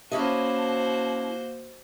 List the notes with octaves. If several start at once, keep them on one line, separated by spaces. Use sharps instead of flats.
A#3 C#4 E4 F#4 C5 D#5 A5